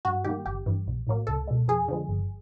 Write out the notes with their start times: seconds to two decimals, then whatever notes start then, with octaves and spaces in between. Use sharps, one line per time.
0.05 G2 F#4
0.24 D#3 G3 A#3 G4
0.46 G1 G4
0.66 G2 E3
0.87 B1
1.07 A2 F#3 A#3
1.27 C#2 A4
1.48 B2 G#3
1.68 F2 G#4
1.88 D3 F3 G#3
2.09 G1